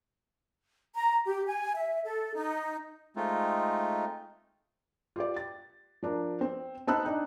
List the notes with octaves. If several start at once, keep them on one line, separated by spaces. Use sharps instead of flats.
A#5
G4
G#5
E5
A4
D#4
G#3 A3 C4 D#4 F4
F4 G4 D5
A6
F3 D4 A#4
C4
C4 D#4 A5 B5 E6 F#6
D4 D#4